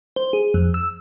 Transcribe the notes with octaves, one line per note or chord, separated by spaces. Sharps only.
C5
G#4
F2
E6